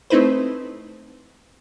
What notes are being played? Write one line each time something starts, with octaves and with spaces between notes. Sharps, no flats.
A3 C4 D#4 E4 B4 C5